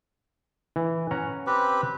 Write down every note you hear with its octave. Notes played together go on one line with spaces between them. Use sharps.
E3
C#4 F#5 A#5
C4 G4 B4